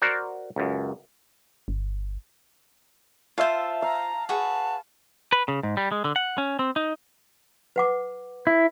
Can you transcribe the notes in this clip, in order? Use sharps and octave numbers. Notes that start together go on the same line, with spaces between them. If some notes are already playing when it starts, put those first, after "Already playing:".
F#4 A#4 C5 D5 F#5
C#2 F#2
G1
F4 C5 E5 F5 A5
F5 A#5
F#4 G#4 B4 A5
B4
C#3
G#2
G3
G#3
D3
F#5
C#4
C4
D#4
B4 F#5 D6
E4